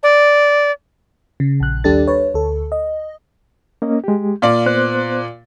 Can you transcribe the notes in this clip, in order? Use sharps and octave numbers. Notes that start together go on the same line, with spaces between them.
D5
C#3
A#1 F#6
D#2 G3 D4 G4 A4 A6
B4 C#5
D2 A4
D#5
A#3 C#4 D#5
G#3 G4
A#2 D5 F5
B3 C5 F#6